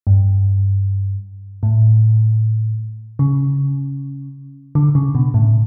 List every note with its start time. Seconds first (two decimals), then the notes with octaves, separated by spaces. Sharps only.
0.07 G2
1.63 A2
3.19 C#3
4.75 D3
4.95 C#3
5.15 B2
5.34 A2